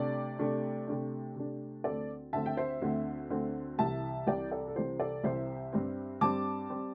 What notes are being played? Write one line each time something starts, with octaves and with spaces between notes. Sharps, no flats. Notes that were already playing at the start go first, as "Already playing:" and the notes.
Already playing: C3 A3 D4 A4 D5
C3 A3 D4
C3 A3 D4
C3 A3 D4
D2 D3 C4 A4 D5
D2 D3 C4 E5 A5
G5
C5 E5
D2 D3 C4
D2 D3 C4
C2 C3 E3 E5 A5
C2 C3 E3 D5 G5
A4 D5
A4
C2 C3 E3 C5
A4 D5
C2 C3 E3 C5 E5
G2 G3 C4
G2 G3 C4 A5 D6
G3 C4